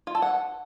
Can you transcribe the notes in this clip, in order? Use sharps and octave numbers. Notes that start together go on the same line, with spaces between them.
F4
A4
F#5